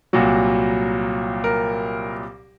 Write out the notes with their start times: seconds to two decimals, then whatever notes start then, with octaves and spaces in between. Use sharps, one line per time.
0.13 C2 A#2 F#3 F#4
1.44 A#4